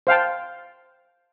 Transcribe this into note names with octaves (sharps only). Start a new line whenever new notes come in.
C5 F5 G5 A5